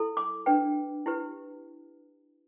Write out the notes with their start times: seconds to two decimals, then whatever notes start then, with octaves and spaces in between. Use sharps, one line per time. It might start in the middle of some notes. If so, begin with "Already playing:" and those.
Already playing: E4 A4
0.17 D6
0.46 D4 B4 G5
1.06 E4 G4 B4